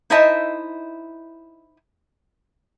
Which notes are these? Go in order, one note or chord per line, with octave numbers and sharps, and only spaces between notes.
D#4 E4 C5 D#5 E5 A5